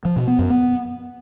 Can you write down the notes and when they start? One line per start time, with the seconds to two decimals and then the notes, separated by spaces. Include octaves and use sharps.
0.05 F3
0.16 B2
0.28 B3
0.39 F#2
0.50 B3